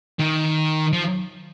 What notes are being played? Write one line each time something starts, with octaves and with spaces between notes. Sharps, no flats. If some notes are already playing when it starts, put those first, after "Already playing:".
D#3
F3